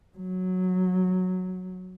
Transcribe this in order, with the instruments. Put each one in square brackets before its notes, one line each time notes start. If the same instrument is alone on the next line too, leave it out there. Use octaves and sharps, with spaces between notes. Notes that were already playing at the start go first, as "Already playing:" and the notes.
[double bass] F#3